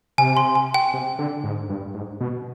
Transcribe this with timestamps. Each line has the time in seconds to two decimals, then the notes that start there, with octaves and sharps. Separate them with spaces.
0.18 C3 G#5
0.37 C6
0.55 G#5
0.74 G5
0.94 C3
1.19 D3
1.44 G#2
1.70 G2
1.94 G#2
2.20 B2